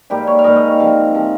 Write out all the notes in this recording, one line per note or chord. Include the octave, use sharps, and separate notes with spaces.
G#2 G3 A#3 G4
C#5
F5
G#2 G3 A#3 D#5
D#5
C#5
C3 F3 C4 F5
C3 F3 C4